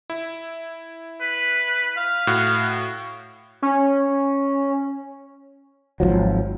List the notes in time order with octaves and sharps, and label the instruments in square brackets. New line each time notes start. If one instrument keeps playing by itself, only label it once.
[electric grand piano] E4
[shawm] B4
F5
[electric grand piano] A2 F#4 F#6
[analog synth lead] C#4
[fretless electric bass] G#1 C#2 F3 F#3